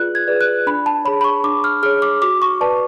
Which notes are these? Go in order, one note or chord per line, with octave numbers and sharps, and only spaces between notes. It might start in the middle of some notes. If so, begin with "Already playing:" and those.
Already playing: F4 G#4 B4 D5 F#6
G#6
G#4 B4 D5
F#6
D4 B5
A5
G#4 C#5 B5
B5
C#6
D4 D6
F6
G#4 C#5 F6
D6
F#4 D6
C#6
B4 D5 A5